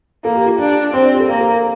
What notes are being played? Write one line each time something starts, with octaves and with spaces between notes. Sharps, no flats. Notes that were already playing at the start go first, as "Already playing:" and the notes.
A#3 A4
G4
F4
D4 G4
C4 C5
D5
G4
A4
A#3 G4
A4
A#4